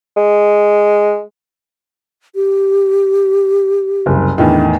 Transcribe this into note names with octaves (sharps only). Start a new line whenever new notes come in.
G#3
G4
F#1 C2
E2 A2 D#3 D4